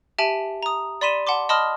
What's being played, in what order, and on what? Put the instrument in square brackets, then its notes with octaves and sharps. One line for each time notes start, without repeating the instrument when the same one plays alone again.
[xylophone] G4 E5 G#5 A5 D7 F#7
A#5 D#6
D5 B5 C6 B6 D#7 E7
F#5 A5 C6 D6
D#5 A5 B5 C6 D#6 F6